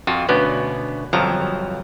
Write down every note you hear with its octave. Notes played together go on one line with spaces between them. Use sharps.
F2 F4 F#4
D2 B2 B3 C#4 D5
G1 F2 F3 F#3 A5 A#5